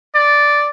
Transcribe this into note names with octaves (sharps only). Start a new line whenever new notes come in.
D5